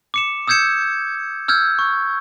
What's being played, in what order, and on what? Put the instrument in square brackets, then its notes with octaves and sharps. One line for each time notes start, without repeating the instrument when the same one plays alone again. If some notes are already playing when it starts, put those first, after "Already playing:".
[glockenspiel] D6 C#7 E7
D#6 E6 G6 G#6 C#7 E7
E6 F6 G6 G#6
C#6